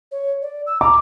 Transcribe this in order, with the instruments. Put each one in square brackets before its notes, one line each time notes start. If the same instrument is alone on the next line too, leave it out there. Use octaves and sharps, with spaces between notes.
[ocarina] C#5
D5
E6
[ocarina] A#5 [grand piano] D6